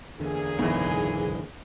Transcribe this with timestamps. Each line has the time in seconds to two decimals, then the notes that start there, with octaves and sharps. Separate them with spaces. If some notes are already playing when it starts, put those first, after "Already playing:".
0.20 E2 A#2 D3 G#4
0.59 F#1 B1 G#2 E3 B3